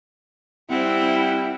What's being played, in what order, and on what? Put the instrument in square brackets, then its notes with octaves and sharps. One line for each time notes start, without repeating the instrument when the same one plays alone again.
[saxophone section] G3 F#5 [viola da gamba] C4 [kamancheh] E4